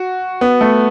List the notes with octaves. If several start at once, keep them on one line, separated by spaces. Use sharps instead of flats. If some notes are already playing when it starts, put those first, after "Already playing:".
Already playing: F#4
B3
A3